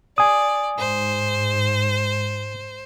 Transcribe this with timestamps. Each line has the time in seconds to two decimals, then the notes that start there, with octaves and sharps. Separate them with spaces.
0.18 D5 G#5 D#6
0.79 G#2 C5